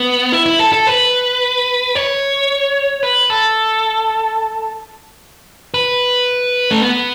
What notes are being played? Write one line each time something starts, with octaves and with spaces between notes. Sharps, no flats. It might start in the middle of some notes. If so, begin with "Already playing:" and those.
Already playing: B3
E4
E4
A4
A4
B4
C#5
B4
A4
B4
A3
B3